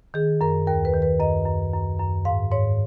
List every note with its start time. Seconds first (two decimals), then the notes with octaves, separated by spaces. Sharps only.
0.14 D#3 G#4
0.41 F#2 A#4
0.67 D#2 A#4
0.85 B4
0.93 D#3
1.02 B4
1.20 F#2 D#5
1.46 F#2
1.73 F#2
1.99 F#2
2.25 G#2 F5
2.52 G#2 C#5